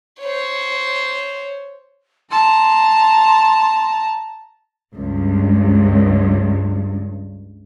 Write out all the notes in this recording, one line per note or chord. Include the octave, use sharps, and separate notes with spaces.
C5 C#5
A5 A#5 C6
C#2 G2